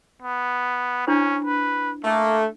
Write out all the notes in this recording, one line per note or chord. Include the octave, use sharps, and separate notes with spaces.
B3
C#4 D4 E4 C5
B4
A3 A#3